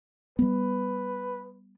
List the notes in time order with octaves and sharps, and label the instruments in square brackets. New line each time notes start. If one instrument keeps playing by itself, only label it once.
[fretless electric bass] G3 B3 [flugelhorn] B4